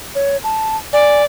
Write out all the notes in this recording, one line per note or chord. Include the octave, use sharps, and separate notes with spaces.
C#5
A5
D5 G#5